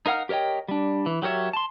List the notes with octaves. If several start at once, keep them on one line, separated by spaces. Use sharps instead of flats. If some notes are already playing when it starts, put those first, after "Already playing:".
D#4 A#4 F5 F#5 F6
G4 A#4 C#5 D#5 G5
G3 D4
E3
F#3 G4 A#4 C#5 E5
A5 C6